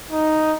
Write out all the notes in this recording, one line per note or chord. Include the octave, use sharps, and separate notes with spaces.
D#4